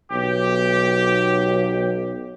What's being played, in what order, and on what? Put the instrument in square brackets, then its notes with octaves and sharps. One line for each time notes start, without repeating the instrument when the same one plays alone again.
[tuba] B1 [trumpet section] G4